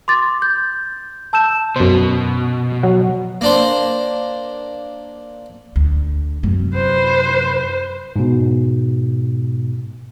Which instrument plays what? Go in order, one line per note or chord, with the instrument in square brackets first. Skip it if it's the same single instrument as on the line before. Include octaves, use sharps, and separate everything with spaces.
[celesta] C6 D6 A6
G6
A5 E6 G6 E7
[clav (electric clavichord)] F#2 C5 [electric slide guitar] B2
[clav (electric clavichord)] F#3 F#5
[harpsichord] A#3 D4 C5
[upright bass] D2
F#2 C3
[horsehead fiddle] B4 C5
[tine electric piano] G#2 B2